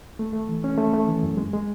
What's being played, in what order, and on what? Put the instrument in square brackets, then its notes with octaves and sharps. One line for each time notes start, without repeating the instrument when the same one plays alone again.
[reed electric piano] A3
A3
E3
C#4
A3
A3
E3
F#2
G#3
G#3